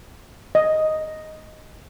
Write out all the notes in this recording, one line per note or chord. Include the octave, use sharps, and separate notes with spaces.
D#5